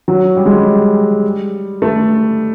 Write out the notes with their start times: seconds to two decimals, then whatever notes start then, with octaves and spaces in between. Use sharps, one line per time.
0.08 F#3
0.37 G3
0.46 G#3
0.54 G3
1.82 A3